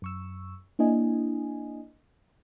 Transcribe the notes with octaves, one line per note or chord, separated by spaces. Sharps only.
F#2 C#6 E6
A#3 D4 E4 D#5 G#5